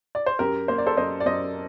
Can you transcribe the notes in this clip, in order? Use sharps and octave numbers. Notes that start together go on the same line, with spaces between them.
D5
C5
F#2 G4 A#4
A#3 C5
D5
A4 C5
F#2 C5 D#5
D5
F#2 C5 D#5